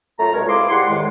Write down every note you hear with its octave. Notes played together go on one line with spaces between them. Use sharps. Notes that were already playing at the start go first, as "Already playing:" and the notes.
F#2 A3 F4 A#5
C2 B2 G#3 A#4 C#5
A#3 C4 E4 G#4 C6 D6
G#2 G3 F#5 C6
E2 A2 D#3 G#3